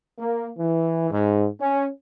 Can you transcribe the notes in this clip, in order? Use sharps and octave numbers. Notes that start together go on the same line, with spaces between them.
A#3
E3
G#2
C#4